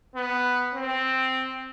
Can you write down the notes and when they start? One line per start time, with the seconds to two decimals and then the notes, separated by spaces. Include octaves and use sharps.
0.15 B3
0.74 C4